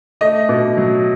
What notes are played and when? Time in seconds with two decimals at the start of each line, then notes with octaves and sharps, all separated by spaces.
0.21 A3 D#5
0.49 B2
0.77 F#3